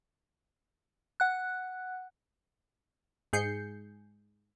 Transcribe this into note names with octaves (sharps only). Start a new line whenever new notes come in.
F#5 F#6
G#2 G#4 G6 C7 C#7